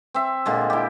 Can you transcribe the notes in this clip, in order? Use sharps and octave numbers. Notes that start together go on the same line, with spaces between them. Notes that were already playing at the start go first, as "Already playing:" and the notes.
C4 E5
A#2 D3 G#3
E4 G4